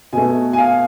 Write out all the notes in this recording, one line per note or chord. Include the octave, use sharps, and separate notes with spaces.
B2 A3 G#5
G#5
F5